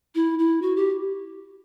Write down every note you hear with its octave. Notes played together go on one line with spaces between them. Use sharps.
E4
E4
F#4
G4